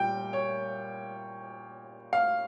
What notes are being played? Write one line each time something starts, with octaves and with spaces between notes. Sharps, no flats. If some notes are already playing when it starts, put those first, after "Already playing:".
Already playing: A#2 G3 G5
C#5
F5